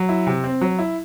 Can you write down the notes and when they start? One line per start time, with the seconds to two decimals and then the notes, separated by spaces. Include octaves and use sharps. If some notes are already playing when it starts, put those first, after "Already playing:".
Already playing: F#3
0.09 E4
0.27 C3
0.44 C4
0.61 F#3
0.79 E4